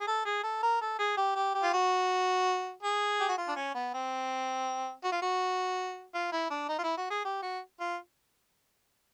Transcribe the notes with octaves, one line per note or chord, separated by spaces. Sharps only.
G#4
A4
G#4
A4
A#4
A4
G#4
G4
G4
G4
F4
F#4
G#4
G4
F#4
F4
D4
C#4
B3
C4
F#4
F4
F#4
F4
E4
D4
D#4
F4
E4
F#4
G#4
G4
F#4
F4